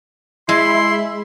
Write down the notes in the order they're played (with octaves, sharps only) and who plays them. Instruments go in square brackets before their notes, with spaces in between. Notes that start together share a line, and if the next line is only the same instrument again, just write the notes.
[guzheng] G#3 [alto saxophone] E4 [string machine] E5 B5 [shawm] C6